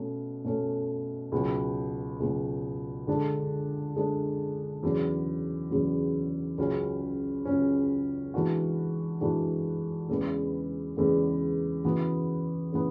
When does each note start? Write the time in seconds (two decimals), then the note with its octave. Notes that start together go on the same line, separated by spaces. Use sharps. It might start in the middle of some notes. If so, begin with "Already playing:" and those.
Already playing: B2 A3 C#4
0.45 B2 A3 C#4
1.32 C#2 B2 F#3
2.20 C#2 B2 F#3
3.07 D3 G#3 D4 A4
3.96 D3 G#3 D4 A4
4.83 E2 C#3 F#3
5.70 E2 C#3 F#3
6.58 C#2 C#3 F#3 C#4
7.45 C#2 C#3 F#3 C#4
8.34 E3 G#3 D4 F#4
9.21 E3 G#3 D4 F#4
10.09 E2 C#3 G#3 B3
10.97 E2 C#3 G#3 B3
11.84 C#3 E3 B3 F#4
12.72 C#3 E3 B3